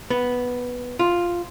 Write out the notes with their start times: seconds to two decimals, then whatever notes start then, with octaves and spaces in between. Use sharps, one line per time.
0.10 B3
0.99 F4